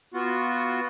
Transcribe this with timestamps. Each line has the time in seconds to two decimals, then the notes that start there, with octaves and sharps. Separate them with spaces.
0.14 B3 F4 F#4